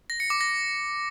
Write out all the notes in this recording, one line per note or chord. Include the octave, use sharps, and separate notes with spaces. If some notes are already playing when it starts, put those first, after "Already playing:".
A#6
C#7
D6
A#6